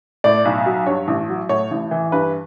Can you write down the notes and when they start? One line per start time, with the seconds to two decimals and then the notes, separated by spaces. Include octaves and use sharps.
0.24 A2 D5
0.45 B1
0.66 F#3
0.87 G2 C#5
1.08 A1
1.29 F#3
1.49 A2 C#5
1.71 A1
1.91 E3
2.12 G2 B4